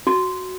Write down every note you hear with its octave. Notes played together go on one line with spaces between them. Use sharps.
F#4